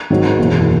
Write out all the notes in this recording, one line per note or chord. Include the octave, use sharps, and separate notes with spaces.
G#2 D#3 F#3
F#1 E2 B2